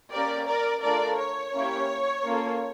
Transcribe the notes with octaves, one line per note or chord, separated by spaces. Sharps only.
A#3 C#4 G4 A#4 D5
A#4 D5
A3 D4 F4 A4 A#4 D5
C#5
A#3 C#4 E4 G4
A#3 C#4 F4 A4